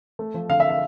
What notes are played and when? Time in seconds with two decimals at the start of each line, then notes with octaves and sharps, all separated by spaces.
0.19 A3
0.34 F3
0.49 D3 F5
0.60 E5
0.70 F5